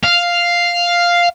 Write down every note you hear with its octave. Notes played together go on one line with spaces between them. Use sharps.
F5